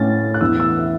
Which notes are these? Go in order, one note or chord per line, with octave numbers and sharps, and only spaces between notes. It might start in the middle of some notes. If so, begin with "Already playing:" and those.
Already playing: A2 A3 C#4 A6
F#6
E2 E3 B3 E6
E6
E5